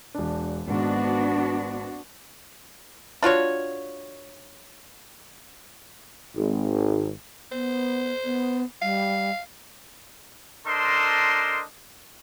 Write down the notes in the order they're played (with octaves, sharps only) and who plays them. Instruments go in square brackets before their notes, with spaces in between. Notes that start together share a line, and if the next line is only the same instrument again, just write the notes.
[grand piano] E1 D4
[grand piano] G#1 G#2 [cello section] B3 D4 F#4
[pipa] D4 F4 F#4 C#5
[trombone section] G#1
[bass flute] B3 [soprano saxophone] C5
[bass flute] B3
[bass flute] G3 [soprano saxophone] F5
[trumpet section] D4 A4 A#4 C5 D#5 C6